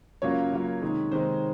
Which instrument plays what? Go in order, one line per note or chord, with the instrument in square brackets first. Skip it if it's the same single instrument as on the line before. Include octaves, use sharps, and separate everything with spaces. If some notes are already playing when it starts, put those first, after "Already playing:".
[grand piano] F#2 C#3 F#3 A#3 F4 [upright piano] C#5
[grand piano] F#2 C#3 F#3 A#3 F4
C3 D#3 G#3 D#4
[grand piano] C3 D#3 G#3 D#4 [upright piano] C5